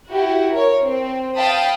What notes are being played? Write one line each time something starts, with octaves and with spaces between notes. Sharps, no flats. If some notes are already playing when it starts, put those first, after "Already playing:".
E4 F#4 G4
A#4 C#5
C4
F5 G5 A5 B5 D#6